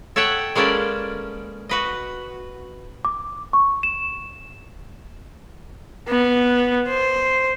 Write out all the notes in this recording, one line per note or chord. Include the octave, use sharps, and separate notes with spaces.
A4 C#5 E5 F#5 G5
G#3 A#3 C#4 A4 B4 D5
F#4 B4 D#5
D6
C#6
E7
B3
C5